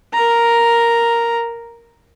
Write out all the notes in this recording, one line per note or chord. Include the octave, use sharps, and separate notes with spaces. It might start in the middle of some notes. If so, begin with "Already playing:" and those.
A#4 A#5